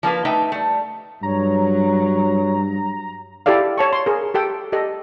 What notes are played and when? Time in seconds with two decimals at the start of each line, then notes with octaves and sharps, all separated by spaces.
0.03 F3 A#3 F4 B4
0.25 A3 D#4 B4 E5 G5
0.52 G3 A3
1.23 G2 F#3 C#5 A#5
3.46 E4 G4 A4 D5 F5
3.78 C#5 A5 C#6
3.93 C6
4.06 G#4 A#4
4.34 G4 A4 G5
4.72 G4 A4 D#5